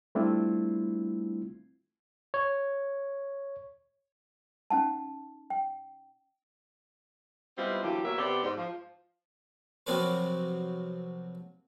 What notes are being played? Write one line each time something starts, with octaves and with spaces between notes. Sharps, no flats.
G3 A3 C4 D4 E4 F4
C#5
C#4 D#4 F#5 A5
G5
G3 G#3 B3 C4 E4 F4
D3 E3 F#3 A#3 G4
B2 F#3 A#3 A#4 C#5 E5
C3 B3 C4 G4 D5
G#2
F3
C3 F3 F#3 C4 A#4 B4